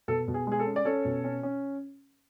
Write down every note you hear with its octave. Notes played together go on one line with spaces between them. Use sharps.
B2 A4
B2
G#4
G#3 G#4
A4
C#4
D5
C#4 A4 C#5
B2
C#4
C#4